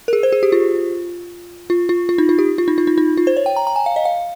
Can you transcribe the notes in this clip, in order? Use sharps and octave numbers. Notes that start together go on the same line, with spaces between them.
A#4
G#4
C5
G#4
G4
F4
F4
F4
F4
D#4
F4
G4
F4
D#4
F4
D#4
D#4
F4
C5
C#5
G5
A#5
A#5
G#5
F5
D#5
F5